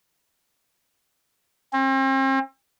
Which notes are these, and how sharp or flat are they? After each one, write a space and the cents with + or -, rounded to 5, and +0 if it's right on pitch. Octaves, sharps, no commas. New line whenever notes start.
C4 +40